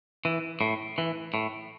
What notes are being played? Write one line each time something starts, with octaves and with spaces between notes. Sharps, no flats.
E3
A2
E3
A2